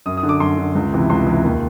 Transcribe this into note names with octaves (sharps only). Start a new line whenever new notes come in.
F#2 D#6
D#6
D3
D6
F#2 C6
D3
C#2
C3 E3
C#2 C6
C3 E3
D#2